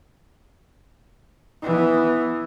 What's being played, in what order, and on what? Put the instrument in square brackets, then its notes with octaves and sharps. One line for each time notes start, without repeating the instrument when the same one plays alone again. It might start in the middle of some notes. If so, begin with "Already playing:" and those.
[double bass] E3 B3